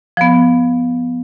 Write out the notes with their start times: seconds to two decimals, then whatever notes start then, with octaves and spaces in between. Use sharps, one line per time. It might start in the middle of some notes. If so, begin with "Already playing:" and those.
0.17 F3 B3